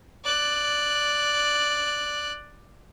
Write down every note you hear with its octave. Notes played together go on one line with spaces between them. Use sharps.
D5 F#6